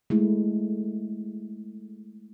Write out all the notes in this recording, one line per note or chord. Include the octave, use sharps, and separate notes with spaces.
G#3 A3 E4